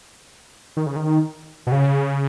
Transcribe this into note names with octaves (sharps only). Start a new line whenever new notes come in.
D#3
C#3
D#3
B2
C#3